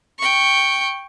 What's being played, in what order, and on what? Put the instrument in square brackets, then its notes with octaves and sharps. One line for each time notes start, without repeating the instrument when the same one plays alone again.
[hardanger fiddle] G5 C#6